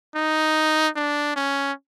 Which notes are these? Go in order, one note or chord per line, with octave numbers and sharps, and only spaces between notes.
D#4
D4
C#4